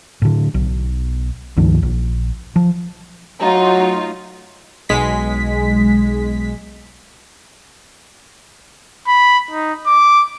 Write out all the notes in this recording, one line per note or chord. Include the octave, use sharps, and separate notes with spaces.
A2 D3
B1
C#2 G2 D#3 F3
A#1
F3
F#3 A3 D#4 F4
B1 G#3 B6
B5
D#4
D6